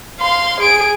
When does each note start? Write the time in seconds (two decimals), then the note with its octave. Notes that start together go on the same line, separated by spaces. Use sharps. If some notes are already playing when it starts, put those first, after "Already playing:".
0.20 F5 C6
0.60 G#4 D7